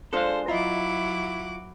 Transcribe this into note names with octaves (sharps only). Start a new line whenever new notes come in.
G#3 D4 F4 A4 C5 F5
F#3 E4 F4 D#5 E5 F#5 A#5 D6